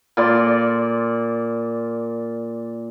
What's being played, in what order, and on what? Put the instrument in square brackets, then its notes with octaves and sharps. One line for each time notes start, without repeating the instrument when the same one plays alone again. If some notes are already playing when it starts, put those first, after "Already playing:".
[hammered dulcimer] A#2 D5 C6